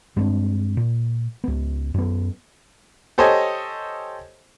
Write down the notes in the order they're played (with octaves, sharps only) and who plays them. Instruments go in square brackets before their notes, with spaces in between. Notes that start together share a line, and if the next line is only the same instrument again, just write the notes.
[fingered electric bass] G2 G#3 C4 D4
A#2
C#2 B3
F#2 B3
[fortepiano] G4 A4 C5 C#5 D#5 G#5